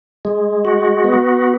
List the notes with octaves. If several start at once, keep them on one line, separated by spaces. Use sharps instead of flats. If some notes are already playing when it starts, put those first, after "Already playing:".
G#3
F#4
B3